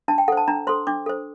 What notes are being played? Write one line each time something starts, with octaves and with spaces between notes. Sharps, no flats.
D4 A5
G5
A4 C5 F#5
A5
D4 A#5
A4 C5 C6
D4 D6
A4 C5